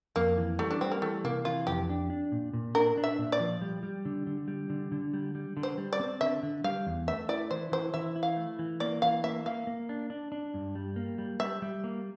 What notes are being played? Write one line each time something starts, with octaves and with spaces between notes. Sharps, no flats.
F2 A#3
E3
G3 A3
D4
G3 C4
A#3
E3 A3
C3 A#3
E3 F4
F2 G4
D4
D4
A#2
A#2
D4 A#4
D4
E5
A#2
D5
F3
G3
G3
D3
D3
G3
D3
D3
G3
G3
D3
C5
G3
D5
C4
D3 E5
D3
G3 F5
E2
A3 E5
E4 D5
E3 C5
E3 C5
E3 E5
E4
F5
A3
E3
A#3 D5
E3 F5
A#3 E5
A#3 F5
A#3
D4
D4
D4
G2
G3
A#3
G3
G3 E5
G3
A#3